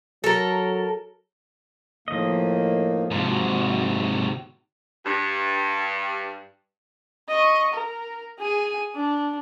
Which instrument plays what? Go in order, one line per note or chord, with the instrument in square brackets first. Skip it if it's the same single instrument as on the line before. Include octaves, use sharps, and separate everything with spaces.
[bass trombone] F#3 [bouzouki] A4 A#4
[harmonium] A2 D#3 A#3 [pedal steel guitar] F3 D#5
[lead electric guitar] G#2 C3 [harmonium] F4 A5
[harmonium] F#4
[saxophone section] G2
[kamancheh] D#5 C#6
A#4
G#4 G#5
D4